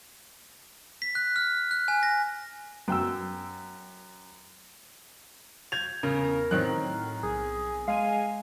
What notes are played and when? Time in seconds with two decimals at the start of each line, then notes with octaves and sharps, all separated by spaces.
1.02 B6
1.15 F#6
1.36 F6
1.71 F#6
1.88 G#5
2.03 A#6
2.88 F#2 G5 E6
5.72 G6 G#6 F7
6.03 E2 C#3 A#4
6.51 A2 D#3 F#3 C4 F#6
7.23 B1 G#4
7.88 G#3 F5 G#5